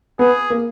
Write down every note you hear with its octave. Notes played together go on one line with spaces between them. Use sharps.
B3 G#4
A#3